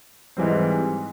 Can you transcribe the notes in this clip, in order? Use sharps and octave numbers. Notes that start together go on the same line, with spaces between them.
G#2 E3 G3 C4